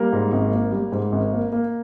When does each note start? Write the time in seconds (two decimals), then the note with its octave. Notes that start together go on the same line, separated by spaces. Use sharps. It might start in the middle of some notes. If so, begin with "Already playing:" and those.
Already playing: G3 A#3 A#4
0.13 G#2
0.32 G#1
0.52 A#3
0.72 G3
0.92 G#2
1.12 G#1
1.32 A#3
1.53 A#3